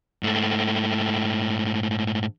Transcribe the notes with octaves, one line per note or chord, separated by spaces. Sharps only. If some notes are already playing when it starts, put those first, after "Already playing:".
G#2 A3